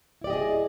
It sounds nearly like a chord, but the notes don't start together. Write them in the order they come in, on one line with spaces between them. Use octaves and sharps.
E4 D5 G4 D#5 G#4